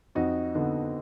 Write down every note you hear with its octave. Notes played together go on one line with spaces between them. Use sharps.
F2 D#4 F#4
D3 B3 D#4